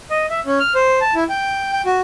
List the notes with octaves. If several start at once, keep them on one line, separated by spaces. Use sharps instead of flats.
D#5
E5
C#4
F6
C5
A5
E4
G5
G5
F#4